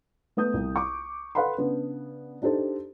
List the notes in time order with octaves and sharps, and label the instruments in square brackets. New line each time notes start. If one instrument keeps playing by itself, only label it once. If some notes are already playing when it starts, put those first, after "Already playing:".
[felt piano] A3 B3 D#6 G6
C2
C#6 D6
A4 B4 F5 F#5 B5 C6
C#3 B3 D4
D4 D#4 G4 A4 C5